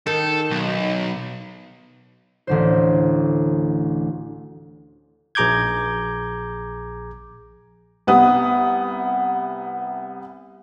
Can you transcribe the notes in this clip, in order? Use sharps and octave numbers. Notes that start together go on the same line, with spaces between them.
D#3 A4
B1
A1 D2 C5
A#1 G#4 A#5 D6 G6 G#6
C2 B3 D#6